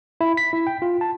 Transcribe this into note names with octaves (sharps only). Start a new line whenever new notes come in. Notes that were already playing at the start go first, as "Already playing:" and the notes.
E4
B6
E4
G5
F4
A5